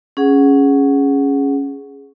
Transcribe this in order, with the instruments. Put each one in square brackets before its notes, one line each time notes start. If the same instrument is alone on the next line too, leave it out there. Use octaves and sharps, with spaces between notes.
[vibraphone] C#4 G#4 F#5